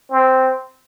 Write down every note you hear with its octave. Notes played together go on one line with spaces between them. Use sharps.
C4